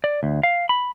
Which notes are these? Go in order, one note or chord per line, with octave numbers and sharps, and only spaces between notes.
D5
D2
F5
B5